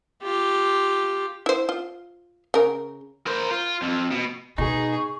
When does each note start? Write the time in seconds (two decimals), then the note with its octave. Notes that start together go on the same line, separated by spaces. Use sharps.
0.22 F4 G4
1.46 E4 C5
1.69 F4
2.54 C#3 A#4
3.27 A#4 C5
3.51 F4
3.82 F2
4.11 B2
4.58 B2 D#4 G#4 C#6